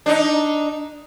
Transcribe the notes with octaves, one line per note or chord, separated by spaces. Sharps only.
D4 D#4